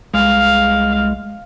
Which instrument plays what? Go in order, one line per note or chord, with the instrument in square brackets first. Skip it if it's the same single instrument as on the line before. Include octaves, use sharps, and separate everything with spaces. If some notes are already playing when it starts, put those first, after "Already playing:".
[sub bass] C2 [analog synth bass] G#3 [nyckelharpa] F5